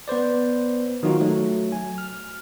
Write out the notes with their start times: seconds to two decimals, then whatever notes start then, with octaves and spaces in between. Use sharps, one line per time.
0.08 B3 B4 C5 D5
1.03 D#3 F#3 D#4 F4 F#4
1.20 F#3 A3
1.72 G#5
1.98 F6